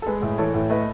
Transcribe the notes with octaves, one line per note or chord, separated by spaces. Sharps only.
A4
G#3 G#4 B4
A2
E3 A4 C#5
A2
A3 B4 D#5